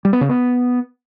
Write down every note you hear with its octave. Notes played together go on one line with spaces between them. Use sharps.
G3
B3
C#3
B3